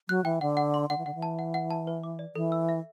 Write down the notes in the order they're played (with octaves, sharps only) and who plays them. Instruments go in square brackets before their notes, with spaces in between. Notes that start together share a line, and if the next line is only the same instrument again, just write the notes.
[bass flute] F#3 [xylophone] F#6
[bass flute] E3 [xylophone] G5
[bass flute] D3 [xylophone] F#5
[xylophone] F#5
C6
[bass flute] D3 [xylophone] F#5
[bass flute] E3
[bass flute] D3 [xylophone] F#5
[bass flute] E3
[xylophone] A5
F#5
F#5
A5
B4
D6
D5
[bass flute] E3 [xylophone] A4
[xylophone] E6
E5